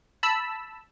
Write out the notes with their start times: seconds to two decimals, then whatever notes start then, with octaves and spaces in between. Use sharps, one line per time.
0.23 A5 B5 E6